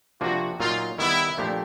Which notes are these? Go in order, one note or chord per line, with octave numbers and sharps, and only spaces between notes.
C3 F3 A#3 D4 F4 F#4
A#2 F#3 A#3 D#4 F4
D#3 G3 B3 E4
A#2 F3 A3 D4 G4